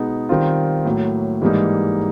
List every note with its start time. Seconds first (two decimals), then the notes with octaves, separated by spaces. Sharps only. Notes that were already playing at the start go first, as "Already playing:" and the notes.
Already playing: B2 G#3 B3 D#4
0.29 D#3 G3 C4 F4
0.85 A2 F#3 A#3
1.42 G#2 E3 G3 A#3 D#4